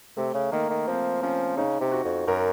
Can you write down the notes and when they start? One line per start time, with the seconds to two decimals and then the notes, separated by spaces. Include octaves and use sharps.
0.17 C3 A3
0.34 C#3
0.52 D#3 A#3
0.70 D#3
0.88 F3 C4
1.23 F3 C#4
1.57 C#3 D#4
1.81 C3
1.92 F#4
2.05 F2
2.27 F#2 A#4